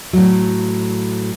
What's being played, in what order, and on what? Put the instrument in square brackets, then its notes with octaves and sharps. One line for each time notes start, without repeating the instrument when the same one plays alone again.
[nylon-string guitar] A2 F#3